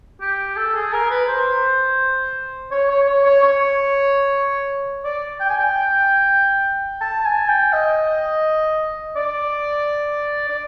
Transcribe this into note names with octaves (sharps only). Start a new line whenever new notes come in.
G4
A4
G#4
A#4
B4
C5
C#5
C#5
C#5
C#5
C#5
D5
G5
G#5
G5
A5
G#5
G5
D#5
D5
D5